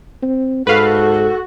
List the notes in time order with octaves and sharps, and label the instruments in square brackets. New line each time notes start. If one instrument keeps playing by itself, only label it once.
[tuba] C4
[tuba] G#2 [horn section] F#4 [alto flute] A4 [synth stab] B4 F5